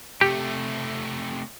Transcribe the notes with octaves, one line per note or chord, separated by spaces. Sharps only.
C3 A3 G4